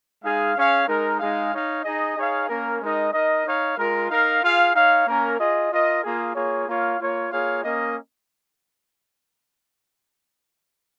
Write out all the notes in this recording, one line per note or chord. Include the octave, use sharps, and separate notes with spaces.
G#3 D#4 G#4 F5
C#4 G#4 C#5 F5
G#3 D#4 A#4
G#3 D#4 G#4 F5
D#4 C#5 F5
D#4 G#4 D#5
D#4 G#4 C#5 F5
A#3 C#4 A#4
G#3 D#4 A#4 D#5
D#4 A#4 D#5
D#4 C#5 F5
G#3 F4 A#4
D#4 A#4 F5
F4 G#4 F5
D#4 C#5 F5
A#3 C#4 A#4
F4 G#4 D#5
F4 A#4 D#5
A#3 F4 G#4
A#3 F4 G#4 C#5
A#3 F4 C#5 F5
A#3 F4 C#5
A#3 F4 G#4 C#5 F5
A#3 C#4 A#4 D#5